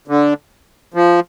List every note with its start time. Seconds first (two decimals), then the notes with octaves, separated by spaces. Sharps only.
0.08 D3
0.94 F3